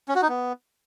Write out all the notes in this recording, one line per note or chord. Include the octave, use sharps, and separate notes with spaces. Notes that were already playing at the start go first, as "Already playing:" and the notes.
C#4
F#4
D#4
B3